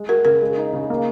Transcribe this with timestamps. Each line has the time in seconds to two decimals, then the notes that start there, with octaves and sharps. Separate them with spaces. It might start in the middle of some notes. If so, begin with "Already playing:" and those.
Already playing: G#3
0.09 F#4 A#4
0.25 C#3 A#4
0.41 G#3
0.57 D#4
0.73 C#3
0.90 A#3